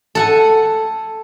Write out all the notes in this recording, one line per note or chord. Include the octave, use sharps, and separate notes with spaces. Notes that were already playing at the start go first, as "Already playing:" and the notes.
A4 F#5 G#5